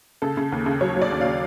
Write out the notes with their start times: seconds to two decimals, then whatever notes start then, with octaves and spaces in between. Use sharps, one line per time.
0.22 C#3 A4
0.37 C#3
0.52 D#2
0.66 C#3
0.81 F#3 C#5
0.96 F#3
1.02 D5
1.12 D#2
1.21 C#3 F5